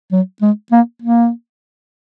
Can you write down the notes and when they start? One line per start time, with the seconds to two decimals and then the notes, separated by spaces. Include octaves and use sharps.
0.12 F#3
0.42 G#3
0.72 A#3
1.02 A#3